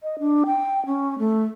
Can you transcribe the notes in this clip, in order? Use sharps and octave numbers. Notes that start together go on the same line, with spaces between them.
D#5
D4
G5
C#4
A3